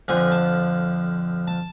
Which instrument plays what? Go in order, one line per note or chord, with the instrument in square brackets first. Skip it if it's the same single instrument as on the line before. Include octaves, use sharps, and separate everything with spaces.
[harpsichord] F2 D3 F3 G#5
A5
A5